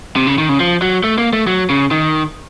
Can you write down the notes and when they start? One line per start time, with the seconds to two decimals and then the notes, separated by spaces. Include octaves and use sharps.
0.16 C3
0.27 C#3
0.38 D#3
0.49 C#3
0.60 F3
0.82 F#3
1.04 A3
1.18 A#3
1.33 A3
1.47 F#3
1.70 C#3
1.91 D#3